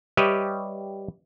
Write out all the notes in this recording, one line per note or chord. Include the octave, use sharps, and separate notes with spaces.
G3 G4 B4 C#5 D#5 E5